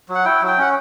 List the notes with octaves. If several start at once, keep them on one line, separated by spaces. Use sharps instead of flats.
F#3
F#5
E4 G5
F#3
G5
C#4 F#5